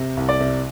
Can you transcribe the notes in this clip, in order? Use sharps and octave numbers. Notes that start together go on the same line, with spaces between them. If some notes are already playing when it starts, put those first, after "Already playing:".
Already playing: C3
C2
D5
C3